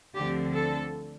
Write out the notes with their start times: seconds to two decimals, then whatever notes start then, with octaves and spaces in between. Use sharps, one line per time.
0.15 D2 D3 F3 C4 G4
0.54 A4